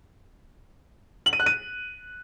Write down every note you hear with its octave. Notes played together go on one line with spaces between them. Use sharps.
F#7
D#7
F#6
D#7